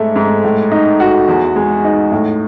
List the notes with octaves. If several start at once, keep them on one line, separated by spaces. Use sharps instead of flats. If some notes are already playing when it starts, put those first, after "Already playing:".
Already playing: G#2 A3
G#2
A2
D#4
F#4
E2
G#3
D#4
A2